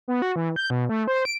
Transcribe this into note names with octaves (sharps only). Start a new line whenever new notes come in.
B3
F#4
E3
G6
B2
A3
C5
D7